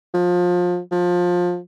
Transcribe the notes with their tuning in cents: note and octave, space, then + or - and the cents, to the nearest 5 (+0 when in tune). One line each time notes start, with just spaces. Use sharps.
F3 +25
F3 +20